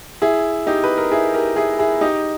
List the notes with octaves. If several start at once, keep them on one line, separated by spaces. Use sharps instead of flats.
E4 G#4
D#4 G4
B4
A#4
E4 G#4
G4 A#4
E4 G#4
E4 G#4
D#4 G4